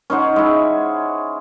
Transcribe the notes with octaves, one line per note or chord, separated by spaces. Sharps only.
C#4 D#4 C5 F#5
G#3 E4